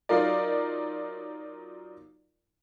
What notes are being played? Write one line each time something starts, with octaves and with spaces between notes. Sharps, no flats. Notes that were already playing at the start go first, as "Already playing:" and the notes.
F#3 D#4 F4 A#4 D5